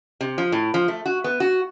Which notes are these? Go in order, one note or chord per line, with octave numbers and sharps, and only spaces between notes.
C3
F3
A2
F3
A3
F#4
B3
F#4